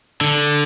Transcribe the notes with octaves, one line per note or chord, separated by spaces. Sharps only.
D3